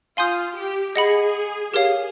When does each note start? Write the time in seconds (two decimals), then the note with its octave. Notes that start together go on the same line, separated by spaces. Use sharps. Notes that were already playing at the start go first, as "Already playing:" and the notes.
0.17 F4 F5 G#5 C6 D#6 G6
0.56 G4
0.96 G#4 D#5 F#5 B5
1.74 G4 G#4 A#4 C#5 F5